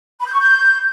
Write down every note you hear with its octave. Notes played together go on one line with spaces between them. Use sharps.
B5
G6
C#6
G6